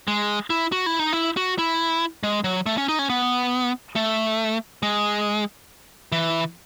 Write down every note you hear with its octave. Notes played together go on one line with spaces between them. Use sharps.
G#3
E4
F#4
E4
D#4
E4
F#4
E4
G#3
F#3
A3
C#4
D#4
C#4
B3
A3
G#3
E3